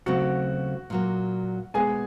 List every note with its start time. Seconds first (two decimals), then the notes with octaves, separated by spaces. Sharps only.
0.06 D#2 C#3 F#3 A3 C4 F#4 F#5
0.90 A#2 F#3 A#3
1.74 B2 G#3 B3 G#4 G#5